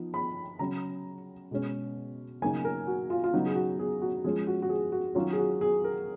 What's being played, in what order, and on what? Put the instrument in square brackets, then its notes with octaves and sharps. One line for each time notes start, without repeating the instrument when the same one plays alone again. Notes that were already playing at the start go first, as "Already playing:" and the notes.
Already playing: [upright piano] F3 B3 D#4
B5
C#3 F#3 C#4 A#5
B2 G#3 C#4
C#3 F#3 A#3 D#4 G#5
A#4
F#4
F4
F4
C#3 F#3 B3 D#4 F#4
G#4
F#4
G#4
F#4
F3 G#3 C#4 G#4
F#4
F#4
G#4
F#4
D#3 F#3 C#4 F4
G#4
F#4
G#4
A#4